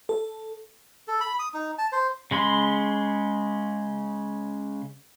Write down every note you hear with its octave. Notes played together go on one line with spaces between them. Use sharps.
A4
A4
B5
D#6
D#4
A5
C5
C#3 G#3 B5 C6